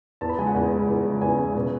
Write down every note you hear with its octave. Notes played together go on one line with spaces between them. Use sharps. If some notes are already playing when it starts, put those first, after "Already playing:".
E2 A5
B5
C#3 G#3 G#5
F#5
E2
C#3 G#3
E2
C#3 G#3
E2 G#5
C#3 G#3
B2